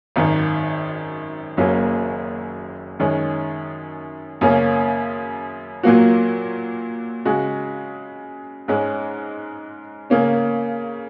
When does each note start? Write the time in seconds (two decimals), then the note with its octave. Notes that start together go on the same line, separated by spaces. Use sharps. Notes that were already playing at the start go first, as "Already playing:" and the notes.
0.16 G#1 F#2 D#3
1.57 F#1 F#2 F#3 A#3 C#4
3.00 F#2 D#3 G#3 C#4
4.41 F#2 C#3 A#3 C#4
5.83 A#2 F#3 A#3 F#4
7.25 C#3 G#3 F#4
8.68 G#2 G#3 C#4
10.10 C#3 A#3 C#4